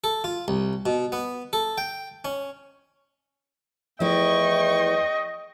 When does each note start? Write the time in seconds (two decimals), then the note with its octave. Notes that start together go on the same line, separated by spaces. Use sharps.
0.04 A4
0.24 F4
0.48 C2
0.86 B2
1.12 B3
1.53 A4
1.78 G5
2.25 C#4
4.00 E2 F3 A3 E4 D#5 G5 C#6